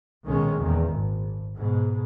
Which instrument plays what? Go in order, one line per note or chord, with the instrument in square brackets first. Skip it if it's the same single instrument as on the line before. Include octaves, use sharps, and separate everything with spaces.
[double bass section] B1 A#2 D#3 G#3 C#4
E2 A#2 D#3
G#1
G#2 B2 G#3